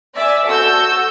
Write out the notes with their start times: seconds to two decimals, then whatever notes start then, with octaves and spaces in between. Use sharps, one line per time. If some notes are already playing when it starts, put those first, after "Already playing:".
0.15 D5 E5 G#5
0.46 F#4 A4 A5 E6 G6